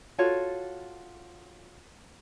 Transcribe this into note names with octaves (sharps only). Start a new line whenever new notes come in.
F4 F#4 A4 C#5